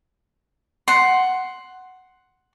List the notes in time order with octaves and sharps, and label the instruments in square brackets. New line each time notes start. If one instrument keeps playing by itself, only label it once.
[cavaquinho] F#5 C6